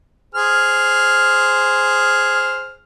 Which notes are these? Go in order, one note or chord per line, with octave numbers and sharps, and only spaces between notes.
G#4 C5 F6